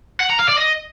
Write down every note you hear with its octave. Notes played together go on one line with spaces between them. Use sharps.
F#5
A#5
F5
D5
D#5